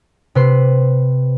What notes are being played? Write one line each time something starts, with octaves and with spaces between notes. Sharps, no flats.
C3 B4 C6